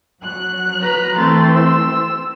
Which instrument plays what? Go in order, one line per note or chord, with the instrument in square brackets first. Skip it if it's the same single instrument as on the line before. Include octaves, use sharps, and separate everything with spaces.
[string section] F#3 F#6
[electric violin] B4 A#5
[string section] E3 C4 C6 [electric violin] A3 A6
[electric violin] E6